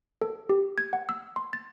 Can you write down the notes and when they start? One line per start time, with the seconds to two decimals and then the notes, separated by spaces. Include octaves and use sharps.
0.22 A4
0.49 G4
0.78 G#6
0.93 F#5
1.09 E6
1.36 C6
1.53 A6